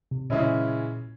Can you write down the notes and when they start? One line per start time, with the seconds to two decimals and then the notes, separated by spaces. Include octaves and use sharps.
0.11 C3
0.30 A#2 C#3 E3 G#3 C#4 E4